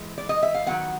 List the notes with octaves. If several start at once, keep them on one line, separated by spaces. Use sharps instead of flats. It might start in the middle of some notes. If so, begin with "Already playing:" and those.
Already playing: E3 G#3
D5
D#5
E5
F5
D#3 F#3 B3 F#5